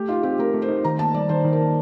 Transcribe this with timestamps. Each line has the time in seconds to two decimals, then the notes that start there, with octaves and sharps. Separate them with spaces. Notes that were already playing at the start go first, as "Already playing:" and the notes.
Already playing: A3 G4
0.08 D#4 F4
0.23 C4 G4
0.39 A3 A#4
0.54 A3
0.62 C5
0.69 D#4
0.84 D#3 A#5
0.99 A#3 A5
1.14 G3 D5
1.29 D#3 C5
1.45 D#3
1.52 A#4
1.60 A#3